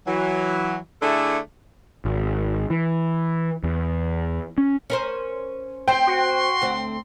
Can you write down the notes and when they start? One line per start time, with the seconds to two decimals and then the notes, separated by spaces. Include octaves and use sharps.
0.07 E3 F#3
1.02 D3 A3 D4 E4 G#4 A4
2.05 G#1
2.70 E3
3.64 E2
4.58 C#4
4.90 C#4 A#4 C5
5.88 C4 C5 G5 C6 G6
6.07 F#4
6.62 D2 C4